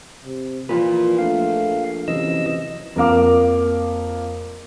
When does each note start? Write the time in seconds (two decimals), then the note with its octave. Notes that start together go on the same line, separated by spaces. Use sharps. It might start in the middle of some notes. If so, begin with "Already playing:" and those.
0.24 C3
0.69 A#2 E3 F3 F4 B4
1.19 A#1 A3 F5
2.08 F#2 C3 E3 D#5 E6
2.96 F2 A#3 A#4 F5 D6